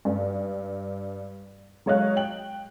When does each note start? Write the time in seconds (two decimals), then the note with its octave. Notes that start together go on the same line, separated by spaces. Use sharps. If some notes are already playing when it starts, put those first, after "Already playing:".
0.05 G2
1.86 F#3 G#3 C#5 D#5 F5 F#6
2.16 G5 F#7